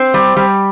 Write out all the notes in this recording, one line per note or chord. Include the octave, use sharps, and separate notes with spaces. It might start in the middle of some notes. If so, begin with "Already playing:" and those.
Already playing: C4
G3
G3